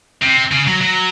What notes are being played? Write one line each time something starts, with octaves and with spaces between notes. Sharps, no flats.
C3
C#3
F#3
F#3